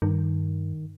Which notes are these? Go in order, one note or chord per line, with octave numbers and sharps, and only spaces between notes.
G2 D#3